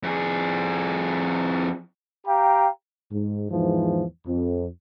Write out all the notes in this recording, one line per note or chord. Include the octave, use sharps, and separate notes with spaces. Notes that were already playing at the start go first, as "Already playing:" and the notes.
F2 G#4
G4 F5 G5 A#5
G#2
E2 G#2 E3 F3
F2